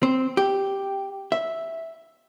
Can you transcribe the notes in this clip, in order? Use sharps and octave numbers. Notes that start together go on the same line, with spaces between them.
C4
G4
E5